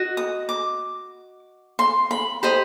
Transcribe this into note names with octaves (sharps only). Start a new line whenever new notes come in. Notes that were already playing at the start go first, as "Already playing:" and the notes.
Already playing: F#4 D#5
D#6
D6
C6
B5
G4 C5 D#5 B5